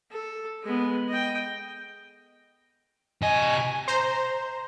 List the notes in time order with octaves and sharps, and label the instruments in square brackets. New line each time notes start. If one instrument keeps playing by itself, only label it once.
[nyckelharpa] A4
G#3 B3
D#5 G5
[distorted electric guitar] C3 D#5 [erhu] G#5
[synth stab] C5 A#5